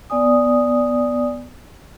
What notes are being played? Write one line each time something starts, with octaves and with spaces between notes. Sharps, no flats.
B3 D5 G#5 D#6